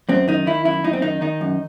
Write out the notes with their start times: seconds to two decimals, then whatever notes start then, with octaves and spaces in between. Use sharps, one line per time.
0.09 F#2 C4
0.28 D#3 D#4
0.46 D#3 E4
0.65 F#2 E4
0.84 F#2 D#4
0.93 C4
1.02 D#3 D#4
1.21 D#3 D#4
1.41 F#2